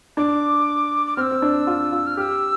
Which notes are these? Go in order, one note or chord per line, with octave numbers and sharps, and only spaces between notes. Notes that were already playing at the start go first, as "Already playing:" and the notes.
D4 D6
D6
C4 F6
E6
C4
D4
F4
F4
F6
G4 E6 F6